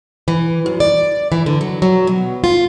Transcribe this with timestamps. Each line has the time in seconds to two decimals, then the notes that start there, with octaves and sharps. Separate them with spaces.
0.28 E3
0.66 F#2
0.80 D5
1.32 E3
1.46 D3
1.61 F#3
1.82 F#3
2.07 B2
2.44 F4